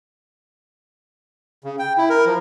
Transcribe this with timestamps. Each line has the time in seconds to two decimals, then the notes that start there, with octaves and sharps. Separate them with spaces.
1.64 C#3
1.79 G5
1.98 E4
2.10 A#4
2.26 F3